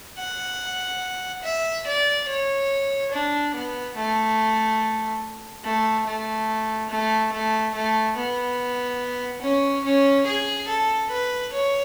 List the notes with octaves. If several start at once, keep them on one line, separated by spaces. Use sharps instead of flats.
F#5
E5
D5
C#5
D4
B3
A3
A3
A3
A3
A3
A3
B3
C#4
C#4
G#4
A4
B4
C#5